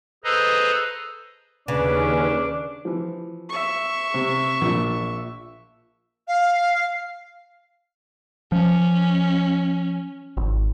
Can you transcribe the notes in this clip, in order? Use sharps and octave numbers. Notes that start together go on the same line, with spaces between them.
G#4 A4 B4 C5 D#5 A#5
D#2 C#3 C#4 D4 B4
E3 F3
E5 C#6
C3
A#1 A#2
F5
F3 C#4
G#1